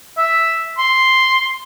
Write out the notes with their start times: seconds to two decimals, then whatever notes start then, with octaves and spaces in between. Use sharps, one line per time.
0.18 E5
0.78 C6